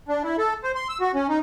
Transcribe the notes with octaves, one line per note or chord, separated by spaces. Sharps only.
D4
E4
A4
C5
C6
E6
F#4
C#4
D#4